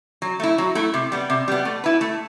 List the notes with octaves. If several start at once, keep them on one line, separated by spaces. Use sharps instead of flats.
F#3
A3 E4
F#3
A3 E4
C3
G3 B3
C3
G3 B3
A3
E4 B4
A3